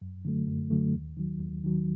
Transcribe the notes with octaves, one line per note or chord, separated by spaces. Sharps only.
F#2
D3 F#3 A3
F#2
D3 F#3 A3
D#2
D#3 F#3
D#2
D#3 F#3